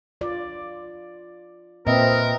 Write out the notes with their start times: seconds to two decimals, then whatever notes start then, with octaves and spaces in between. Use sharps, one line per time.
0.21 F4 D5
1.87 A#2 C4 A#4 B4 D#5 E5